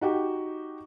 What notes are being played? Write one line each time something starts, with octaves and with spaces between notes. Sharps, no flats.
D#4 F#4 G4